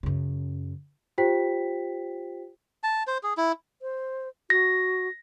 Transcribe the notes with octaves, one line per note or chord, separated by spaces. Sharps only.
F#2 C#3
F4 G4 C5 G5 B6
A5
C5
G#4
E4
C5
F#4 A#6